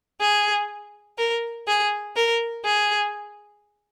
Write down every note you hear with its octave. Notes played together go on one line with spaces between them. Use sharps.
G#4
A#4
G#4
A#4
G#4